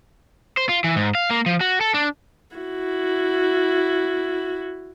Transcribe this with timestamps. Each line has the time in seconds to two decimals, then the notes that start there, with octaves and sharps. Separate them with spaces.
0.57 C5
0.69 F4
0.84 E3
0.96 G#2
1.15 F5
1.30 A#3
1.46 F3
1.61 F#4
1.81 A4
1.94 D4
2.56 E4 F#4